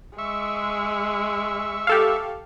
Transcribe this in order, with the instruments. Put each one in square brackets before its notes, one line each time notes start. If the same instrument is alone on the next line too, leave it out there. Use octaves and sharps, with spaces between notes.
[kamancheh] G#3 [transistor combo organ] E5 C#6
[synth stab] G4 A4 F5